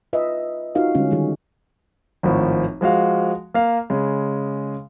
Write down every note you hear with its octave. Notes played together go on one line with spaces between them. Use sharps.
F4 B4 D#5 E5
D#4 F4 F#4 A#4 F5
D3 G3 G#3 C#4
D#3 G3 G#4
G#1 A2 F3
F3 G#3 F#4 F5
A#3 F5
C#3 G#3